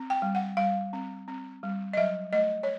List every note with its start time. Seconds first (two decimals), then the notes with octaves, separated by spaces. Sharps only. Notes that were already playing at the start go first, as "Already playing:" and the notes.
Already playing: C4
0.10 G5
0.22 G3
0.35 F#5
0.57 G3 F5
0.93 C4
1.28 C4
1.63 G3
1.93 D#5
1.97 F#3 E5
2.33 A3 D#5
2.63 C#5